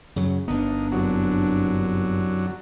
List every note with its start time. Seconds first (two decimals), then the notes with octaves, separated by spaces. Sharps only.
0.16 F#2 C#3 F#3
0.48 G1 A#3 B3 D4 D#4
0.92 C2 F#2 D3 F#3